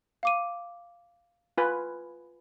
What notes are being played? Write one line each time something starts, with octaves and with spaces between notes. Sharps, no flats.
F5 D6 D#7
F4 B4 G#5